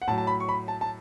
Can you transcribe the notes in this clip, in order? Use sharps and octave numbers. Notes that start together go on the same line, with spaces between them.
F#5
A2 F#3 A5
A5
B5
C#6
B5
A5
A5